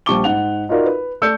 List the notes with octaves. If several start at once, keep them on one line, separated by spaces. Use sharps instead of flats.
A#1 G3 A5 C#6 D6 G7
G#2 F#5 F7
D#4 F4 F#4 A#4 D5
B4
A3 D5 E6 G6 C#7